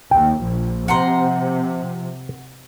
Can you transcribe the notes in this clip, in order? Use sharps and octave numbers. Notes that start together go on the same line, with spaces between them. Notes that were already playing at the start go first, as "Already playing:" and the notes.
D#2 G5
A#1 F3
C3 F#5 A#5 C6